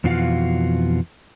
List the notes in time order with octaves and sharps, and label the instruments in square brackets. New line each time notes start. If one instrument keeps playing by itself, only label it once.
[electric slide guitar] F2 B2 E3 F4 F#4 F5